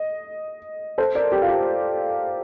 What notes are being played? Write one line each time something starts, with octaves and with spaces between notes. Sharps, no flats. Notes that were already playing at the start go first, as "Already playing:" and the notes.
Already playing: D#5
A4 C5
A#4 D5
G4
F4
G4